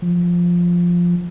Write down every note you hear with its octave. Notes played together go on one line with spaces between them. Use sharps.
F3